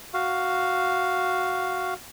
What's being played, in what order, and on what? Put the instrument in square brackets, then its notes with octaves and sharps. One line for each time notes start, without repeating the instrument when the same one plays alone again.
[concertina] F#4 F5